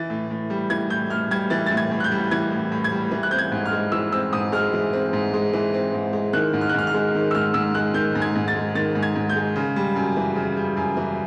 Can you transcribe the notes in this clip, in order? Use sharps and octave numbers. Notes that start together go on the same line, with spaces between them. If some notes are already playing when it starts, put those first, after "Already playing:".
Already playing: E3 A6
A2
A2
G3
E3 G#6
A2 G6
A2 F6
G3 G#6
E3 A6
A2 A6
G#6
A2
F#6
G6
G3
E3 G#6
A2
A2
G#6
G3
E3
F#6
C4 G6
G#6
G#2
F6
G#3
E3 E6
C4 E6
G#2 D#6
G#3 F6
E3
C4
G#2
G#3
E3
C4
G#2
G#3
D#3 F#6
G#2
F6
F#6
G#2 F6
F6
G#3
D#3
E6
G#2 F6
G#2 E6
G#3 F#6
D#3 G6
G#2
G#6
G#2
A6
G#3
D#3 A6
G#2
G#6
G#2
G6
G#3
C#3
G3
F#2
E3
C#3
G3
F#2
E3